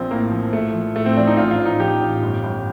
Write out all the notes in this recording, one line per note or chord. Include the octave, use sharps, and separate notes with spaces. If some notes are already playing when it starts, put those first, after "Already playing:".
Already playing: A#1 F3 C4
A2 A#3
F3
A2 A3
F3
A2 A3
C4
F3 D4
D#4
A1 F4
F4
A1
D#4
F3 G4
A1
G1
G1